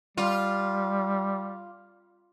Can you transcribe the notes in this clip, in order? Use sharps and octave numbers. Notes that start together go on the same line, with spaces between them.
G3 F4